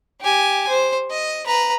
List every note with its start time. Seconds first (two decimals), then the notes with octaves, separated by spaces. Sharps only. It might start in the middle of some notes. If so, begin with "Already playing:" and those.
0.21 G4 G#5
0.69 C5
1.11 D#5
1.46 B4 A#5